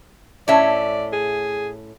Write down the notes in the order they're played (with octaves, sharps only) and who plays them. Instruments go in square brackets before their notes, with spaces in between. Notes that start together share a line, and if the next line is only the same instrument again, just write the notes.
[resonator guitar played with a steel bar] A2 C#4 E5 [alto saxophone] D5
[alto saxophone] G#4